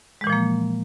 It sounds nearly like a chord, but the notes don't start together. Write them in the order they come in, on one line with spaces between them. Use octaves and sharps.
G#3 E3 A#2 F3 A#3